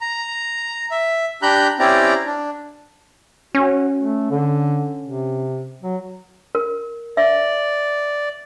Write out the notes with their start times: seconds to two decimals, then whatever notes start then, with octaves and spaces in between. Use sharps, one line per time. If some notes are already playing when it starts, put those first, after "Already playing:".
0.01 A#5
0.91 E5
1.42 D4 G4 A#5 B5 F#6 G6
1.79 C4 C#4 E4 G4 D5 A#5
2.26 D4
3.55 C#4 F#4
3.99 A3
4.30 D3
5.05 C3
5.82 F#3
6.55 A#4
7.17 D5 E5